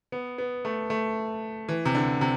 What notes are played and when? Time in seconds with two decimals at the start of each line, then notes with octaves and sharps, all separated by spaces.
0.12 B3
0.38 B3
0.65 A3
0.90 A3
1.69 E3
1.85 C3
1.95 D3
2.21 C3